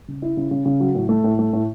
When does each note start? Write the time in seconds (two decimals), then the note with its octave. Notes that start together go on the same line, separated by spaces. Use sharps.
0.08 C#3
0.22 E4
0.37 C#3
0.51 C#3
0.65 C#3
0.80 F#3
0.95 A2
1.09 A3
1.24 A2
1.39 A3
1.53 A2